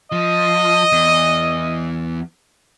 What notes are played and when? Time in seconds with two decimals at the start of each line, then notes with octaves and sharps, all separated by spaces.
0.12 F3 D#5
0.92 E2